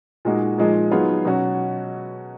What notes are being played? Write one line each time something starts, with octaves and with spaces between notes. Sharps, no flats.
A#2 G#3 D#4 F#4
A#2 F3 G#3 D#4
D#3 F#3 B3 F4 G#4
B2 F#3 C#4 F#4